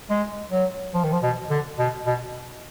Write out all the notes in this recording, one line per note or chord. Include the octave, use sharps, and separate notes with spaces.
G#3
F#3
F3
D#3
F3
B2
D3
B2
B2